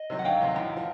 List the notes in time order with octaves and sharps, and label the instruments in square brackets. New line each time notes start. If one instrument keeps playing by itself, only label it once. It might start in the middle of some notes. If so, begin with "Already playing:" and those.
Already playing: [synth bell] D#5
[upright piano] C3 D#3 F#3
[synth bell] F#5
[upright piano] D2 [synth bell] F5 G5
[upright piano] C3 D#3 F#3
A1
F3